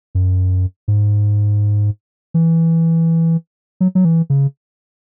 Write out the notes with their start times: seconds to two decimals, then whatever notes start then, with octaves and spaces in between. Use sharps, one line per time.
0.15 F#2
0.88 G#2
2.34 E3
3.81 F#3
3.95 F#3
4.05 E3
4.30 C#3